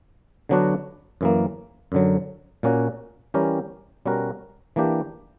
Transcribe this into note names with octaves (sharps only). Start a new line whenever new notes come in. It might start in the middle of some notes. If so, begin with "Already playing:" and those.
D3 F#3 B3 D4 F#4
F#2 E3 A#3
F#2 D3 F#3
A#2 A#3 C#4 F#4
E3 G3 C#4 G4 A#4
B2 G3 C#4 F#4 A#4
E3 A#3 D4 G4